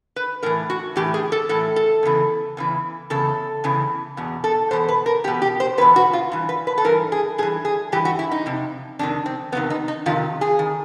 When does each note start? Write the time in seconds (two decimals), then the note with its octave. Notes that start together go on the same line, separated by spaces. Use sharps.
0.16 B4
0.43 A2 E3 A#4
0.70 F#4
0.96 A2 E3 G4
1.14 G#4
1.32 A4
1.49 A2 E3 A4
1.76 A4
2.03 E2 C#3 E3
2.57 E2 C#3 E3
3.10 E2 C#3 A4
3.64 E2 C#3 E3
4.17 E2 B2
4.44 A4
4.71 E2 B2 C5
4.89 B4
5.06 A#4
5.24 E2 G4
5.28 B2
5.42 G4
5.60 C5
5.78 E2 B4
5.81 B2
5.96 F#4
6.13 F4
6.32 G2 E3
6.49 B4
6.67 B4
6.78 A4
6.84 G2 E3 A#4
7.12 G#4
7.38 G2 G#4
7.43 E3
7.65 G#4
7.92 G2 E3 G4
8.05 F#4
8.19 E4
8.31 D#4
8.46 F2 C3
8.99 F2 C3 D#3 D4
9.26 C4
9.52 F2 C3 D#3 B3
9.70 D#4
9.88 D#4
10.06 F2 C3 D#3 F4
10.41 G#4
10.59 D#3